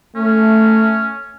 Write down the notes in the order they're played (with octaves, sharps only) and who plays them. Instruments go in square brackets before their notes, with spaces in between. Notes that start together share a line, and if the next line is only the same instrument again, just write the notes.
[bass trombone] A3 [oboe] C#4